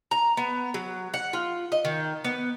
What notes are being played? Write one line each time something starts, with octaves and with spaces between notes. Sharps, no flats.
A#5
B3
F#3
F#5
F4
D#5
D#3
B3